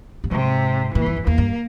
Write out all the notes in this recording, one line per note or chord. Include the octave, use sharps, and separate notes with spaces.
G2
G#2 C3
A#2 E3
G2
F2
E2 A#3
G2